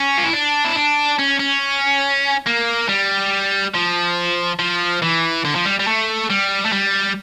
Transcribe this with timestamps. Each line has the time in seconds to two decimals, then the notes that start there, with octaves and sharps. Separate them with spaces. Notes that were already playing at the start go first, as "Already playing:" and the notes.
Already playing: C#4
0.18 F4
0.25 E4
0.33 D4
0.64 E4
0.75 D4
1.19 C#4
1.39 C#4
2.46 A#3
2.89 G3
3.74 F3
4.59 F3
5.02 E3
5.45 D3
5.55 F3
5.65 G3
5.79 G3
5.87 A3
6.30 G3
6.65 A3
6.72 G3